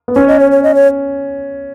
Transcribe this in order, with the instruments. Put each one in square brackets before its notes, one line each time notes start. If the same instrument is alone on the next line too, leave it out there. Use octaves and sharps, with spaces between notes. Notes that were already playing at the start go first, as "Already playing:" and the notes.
[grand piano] B3
[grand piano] C#4 [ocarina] C#5
[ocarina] D#5
C#5
C#5
D#5
C#5